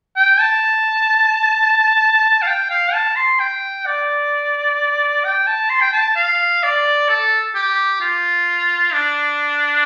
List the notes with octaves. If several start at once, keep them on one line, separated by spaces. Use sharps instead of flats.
G5
A5
F5
G5
F5
A5
C6
G5
D5
G5
A5
C6
G5
A5
F5
D5
A4
G4
F4
D4